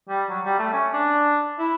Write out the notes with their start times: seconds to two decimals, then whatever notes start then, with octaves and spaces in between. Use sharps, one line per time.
0.08 G3
0.29 F#3
0.45 G3
0.59 A3
0.73 C#4
0.94 D4
1.58 E4